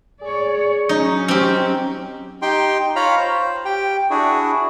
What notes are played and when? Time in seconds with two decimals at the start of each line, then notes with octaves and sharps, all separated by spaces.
0.21 G#4 C#5 D5
0.89 F#3 C#4 D#4
1.28 C4 G4 F6
2.42 D#4 G4 G5 C6
2.96 F4 C#5 F5 A#5 B5
3.18 C5
3.65 G4 G5
4.10 D4 E4 F#4 G#4